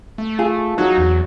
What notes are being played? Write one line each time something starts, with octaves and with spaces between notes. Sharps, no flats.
A3
F4 G#4
F#3 D#4
E2